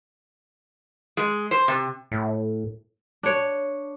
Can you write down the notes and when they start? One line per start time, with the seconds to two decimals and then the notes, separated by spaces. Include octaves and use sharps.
1.17 G#3
1.51 C5
1.68 C3
2.12 A2
3.23 D4 C#5